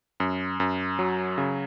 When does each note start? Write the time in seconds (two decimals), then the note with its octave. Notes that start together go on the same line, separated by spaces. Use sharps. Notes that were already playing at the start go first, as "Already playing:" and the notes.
0.20 F#2
0.60 F#2
0.99 F#3
1.38 C#3